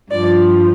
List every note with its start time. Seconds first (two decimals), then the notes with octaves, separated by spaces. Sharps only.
0.11 G2 F3 D5